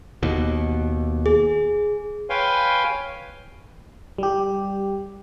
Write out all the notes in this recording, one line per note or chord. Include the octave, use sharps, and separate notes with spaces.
D#2 B2
G#4
B4 C#5 F5 G5 G#5 C6
G3 G4